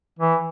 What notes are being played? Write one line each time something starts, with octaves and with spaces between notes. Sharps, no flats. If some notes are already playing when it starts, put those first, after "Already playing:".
E3